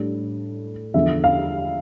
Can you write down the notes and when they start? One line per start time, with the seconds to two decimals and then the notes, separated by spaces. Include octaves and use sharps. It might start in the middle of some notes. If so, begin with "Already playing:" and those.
Already playing: A2 G3 D4
0.94 E2 D3 F3 E5
1.24 F5